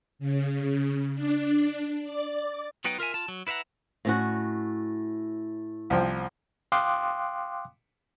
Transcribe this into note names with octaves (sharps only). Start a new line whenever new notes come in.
C#3
D4
D5
F#3 B3 D#4 B4 G5
F4 A#4 E5 G#5
F4 A5
F#3
E4 B4 E5 F#5 A#5
A2 C#4 F#4
C2 F3 G5
F5 G5 C6 D6 D#6 F#6